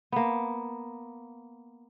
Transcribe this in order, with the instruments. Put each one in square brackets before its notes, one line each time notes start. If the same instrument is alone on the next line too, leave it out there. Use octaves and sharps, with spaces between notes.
[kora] A#3 B3